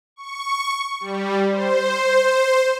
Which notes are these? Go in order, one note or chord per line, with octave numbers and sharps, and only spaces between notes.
C#6
G3
C5